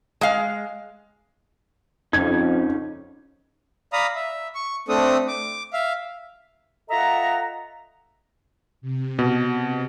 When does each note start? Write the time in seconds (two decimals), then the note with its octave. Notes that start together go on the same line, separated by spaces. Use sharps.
0.21 G#3 F5
2.13 F2 C#3 C#4 D#4 G#6
3.93 D5 F5 A#5 B5 D#6
4.15 E5
4.55 C#6
4.89 A3 C4 D4 A4 D#6
5.28 D6
5.73 E5 F5
6.90 F4 A4 D#5 E5 F#5 A#5
8.81 C3
9.19 B2